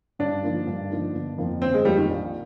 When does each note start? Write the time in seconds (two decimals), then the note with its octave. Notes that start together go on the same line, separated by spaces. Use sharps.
0.19 G2 D4
0.43 D3 F3 A#3 D#4
0.67 G2
0.90 D3 F3 A#3 D#4
1.14 G1
1.38 F2 D3 F3 A#3
1.61 G1 C4
1.74 G#3
1.85 F2 D3 F3 G3 A#3
1.97 D#3
2.09 A#1